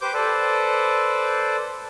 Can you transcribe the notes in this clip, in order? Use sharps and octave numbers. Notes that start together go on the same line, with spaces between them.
G4 B4 C5 D6 G6
A4 B4 C5 D5